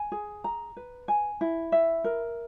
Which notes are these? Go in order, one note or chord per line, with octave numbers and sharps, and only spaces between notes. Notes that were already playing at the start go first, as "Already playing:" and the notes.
Already playing: G#5
G#4
A#5
B4
G#5
E4
E5
A#4